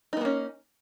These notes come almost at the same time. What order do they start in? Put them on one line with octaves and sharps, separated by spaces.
D#4 B3 A#3 C#4